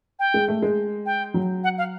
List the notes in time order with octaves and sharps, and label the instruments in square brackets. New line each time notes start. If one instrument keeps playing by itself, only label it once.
[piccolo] G5
[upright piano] G#3
A3
G#3
[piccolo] G5
[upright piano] F#3
[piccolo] F#5
F5